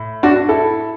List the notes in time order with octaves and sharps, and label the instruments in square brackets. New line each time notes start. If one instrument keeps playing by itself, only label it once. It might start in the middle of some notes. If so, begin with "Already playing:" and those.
Already playing: [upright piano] A2
D4 F#4
E4 A4